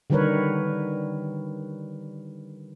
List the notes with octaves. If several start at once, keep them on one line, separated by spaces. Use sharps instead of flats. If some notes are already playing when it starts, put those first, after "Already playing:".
D3 D#3 G3 A#4 B4 C#5